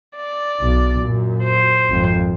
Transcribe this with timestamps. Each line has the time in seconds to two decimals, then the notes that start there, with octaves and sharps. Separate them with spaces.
0.16 D5
0.60 B1
0.98 F#2 A#2
1.43 C5
1.88 G#1 F2